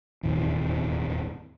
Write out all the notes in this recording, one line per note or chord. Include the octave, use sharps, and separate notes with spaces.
D#1 G#1 E2 C3